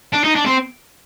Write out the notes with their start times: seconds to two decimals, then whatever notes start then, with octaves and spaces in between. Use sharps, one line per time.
0.13 D4
0.24 D#4
0.35 D4
0.46 C4